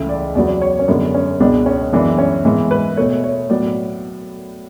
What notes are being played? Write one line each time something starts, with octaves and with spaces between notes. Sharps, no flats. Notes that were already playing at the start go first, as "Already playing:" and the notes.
Already playing: C#2 C#3 E3 A3 E5
D5
E2 C#3 F#3 B3 D5
C#5
C#4
F#2 D3 G#3 B3 D4
C#4
C#2 B2 G#3 B3 D4
C#4
F#2 E3 G#3 B3 D4
C#4
G#2 E3 G#3 B3
B4
B2 A3 C#5
C#5
A2 F#3 B3 D5